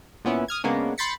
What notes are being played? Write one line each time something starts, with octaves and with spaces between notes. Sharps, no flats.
A#2 B3 C#4 E4
D#6 F6 G#6
C#3 G#3 A#3 B3 C#4 D4
B5 C6 G6 A6 B6 C#7